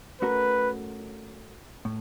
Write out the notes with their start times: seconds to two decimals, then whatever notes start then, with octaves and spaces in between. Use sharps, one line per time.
0.22 A3 C#4 F#4 A#4 B4
1.85 A2